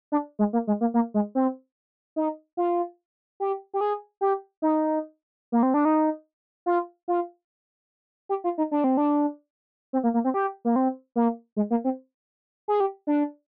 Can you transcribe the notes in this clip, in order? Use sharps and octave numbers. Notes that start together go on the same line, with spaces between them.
D4
G#3
A#3
G#3
A#3
A#3
G#3
C4
D#4
F4
G4
G4
G#4
G4
D#4
A#3
C4
D4
D#4
F4
F4
G4
F4
D#4
D4
C4
D4
C4
A#3
A#3
C4
G4
A#3
C4
A#3
G#3
A#3
C4
G#4
G4
D4